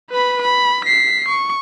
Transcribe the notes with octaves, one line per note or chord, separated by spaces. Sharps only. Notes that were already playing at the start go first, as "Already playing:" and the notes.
B4 B5
B5
B6 C7
C#6